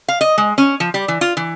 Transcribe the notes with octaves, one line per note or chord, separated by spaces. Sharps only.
F5
D#5
G#3
C#4
F3
G3
E3
F4
E3